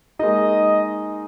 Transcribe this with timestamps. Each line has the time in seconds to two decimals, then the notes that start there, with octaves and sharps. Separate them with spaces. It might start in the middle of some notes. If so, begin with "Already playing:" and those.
0.19 G#3 A#3 D#4 D#5